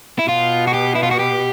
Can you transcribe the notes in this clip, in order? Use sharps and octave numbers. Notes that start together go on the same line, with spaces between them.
E4
B2 F4
F#4
G4
E4
F4
F#4
G4